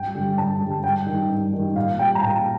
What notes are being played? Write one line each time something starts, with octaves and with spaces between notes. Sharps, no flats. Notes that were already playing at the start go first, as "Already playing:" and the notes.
Already playing: G2 G5
D3 G3
G2 A5
D3 G3
G2 G5
D#3 G3
G2
D#3 G3
A#2 F5
G3 G5
A#5
A#2 A5